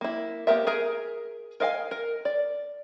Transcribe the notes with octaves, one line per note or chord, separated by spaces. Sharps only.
A#3 E4
A#3 B3 G4 A#4 E5
G#4 A#4 G#5 A#5
A#4 D#5 F5 F#5 G#5
A#4
D5